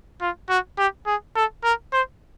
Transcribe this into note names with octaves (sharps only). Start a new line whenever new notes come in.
F4
F#4
G4
G#4
A4
A#4
C5